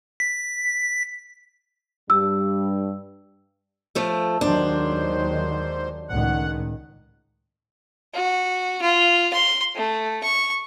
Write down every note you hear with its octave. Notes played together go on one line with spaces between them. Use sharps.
B6
G2 G3 E6
F3 A3 A4
D#2 G#2 D#3 F#3 D4 C5
C#2 A2 D#3 F#5
F#4
F4
C6
A3
C#6